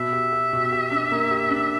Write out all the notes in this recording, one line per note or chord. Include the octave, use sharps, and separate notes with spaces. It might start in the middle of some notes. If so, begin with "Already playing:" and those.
Already playing: B2 E5
G4
G4
B2
G4
D4
A#3
G4
D4